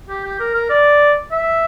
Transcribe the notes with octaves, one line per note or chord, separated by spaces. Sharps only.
G4
G4
A#4
A#4
D5
E5